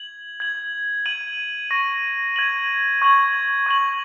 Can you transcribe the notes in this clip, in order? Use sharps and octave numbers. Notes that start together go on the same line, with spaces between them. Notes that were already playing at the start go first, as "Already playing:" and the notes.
Already playing: G#6 F#7
G#6 F#7
G#6 D#7 F#7
C#6 A#6 D#7
G#6 D#7 F#7
C#6 G#6 F#7
C#6 G#6 F#7